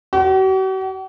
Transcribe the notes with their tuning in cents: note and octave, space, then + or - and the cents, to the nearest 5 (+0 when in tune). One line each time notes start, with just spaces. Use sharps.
F#4 +45